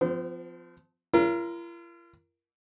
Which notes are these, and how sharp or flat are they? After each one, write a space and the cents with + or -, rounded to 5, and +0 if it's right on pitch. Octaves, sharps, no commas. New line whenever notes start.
F3 +0 C4 -45
F4 -45 A#4 +10